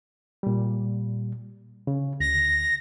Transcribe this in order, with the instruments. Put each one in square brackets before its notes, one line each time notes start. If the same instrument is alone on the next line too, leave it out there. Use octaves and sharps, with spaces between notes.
[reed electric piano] A#2 G3
C#3
[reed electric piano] D2 [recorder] A#6